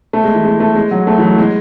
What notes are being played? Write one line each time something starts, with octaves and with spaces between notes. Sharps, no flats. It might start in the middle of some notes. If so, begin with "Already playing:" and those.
A3
G#3
E3
G#3
A3
G#3
F#3
A3
E3
F#3
G#3